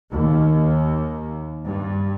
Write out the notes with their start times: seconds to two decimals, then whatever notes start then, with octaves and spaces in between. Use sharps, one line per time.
0.10 D#2
1.66 G2